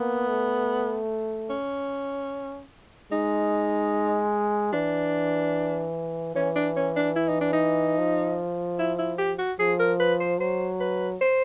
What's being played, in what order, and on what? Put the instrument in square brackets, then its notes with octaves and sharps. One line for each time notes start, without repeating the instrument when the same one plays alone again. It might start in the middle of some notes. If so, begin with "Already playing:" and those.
Already playing: [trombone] A#3 [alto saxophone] B3
[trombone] A3
[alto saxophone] C#4
[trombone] G#3 [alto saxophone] D#4
[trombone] E3 [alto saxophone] D4
[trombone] E3 [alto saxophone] C#4
[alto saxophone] D4
C#4
D4
E4
D#4
D4
D#4
[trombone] F3
[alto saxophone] E4
E4
G4
F#4
[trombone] F3 [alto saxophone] G#4
[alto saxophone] A#4
B4
C5
[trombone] F#3 [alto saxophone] C5
[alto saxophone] B4
C5